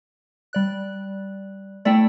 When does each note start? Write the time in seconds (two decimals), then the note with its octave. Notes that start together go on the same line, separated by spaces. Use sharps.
0.53 G3 D5 F#6
1.85 A3 E4 D5 G5